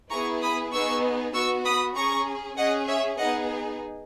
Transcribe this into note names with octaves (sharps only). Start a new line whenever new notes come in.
B3 E4 G#4 A#5 C#6
B5 D#6
B3 D#4 G#4 C#6 E6
B3 F#4 C#6 E6
B5 D#6
C#4 G#4 A#5 C#6
C#4 G#4 D#5 F#5
C#5 E5
B3 D#4 G#4 D#5 F#5